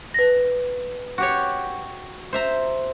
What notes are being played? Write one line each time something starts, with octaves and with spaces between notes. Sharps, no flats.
B4 A#6
F#4 G4 C#5
C5 E5 A#5